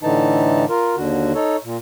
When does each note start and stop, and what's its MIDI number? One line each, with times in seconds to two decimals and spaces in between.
0.03 0.65 45
0.03 0.65 50
0.03 0.65 52
0.03 0.65 63
0.03 0.65 81
0.69 0.95 65
0.69 0.95 70
0.96 1.32 39
0.96 1.32 50
0.96 1.32 66
1.35 1.56 63
1.35 1.56 69
1.35 1.56 73
1.64 1.77 46